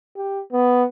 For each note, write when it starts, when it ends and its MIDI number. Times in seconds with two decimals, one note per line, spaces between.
0.16 0.42 67
0.52 0.84 59